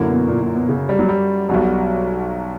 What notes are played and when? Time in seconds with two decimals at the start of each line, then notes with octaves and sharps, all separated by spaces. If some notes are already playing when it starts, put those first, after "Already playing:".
Already playing: F#2 D3 A#3 E4
0.08 B2
0.28 A#2
0.42 A#2
0.55 B2
0.69 C#3
0.89 G3
0.99 F#3
1.09 G3
1.49 B1 B2 F#3 G3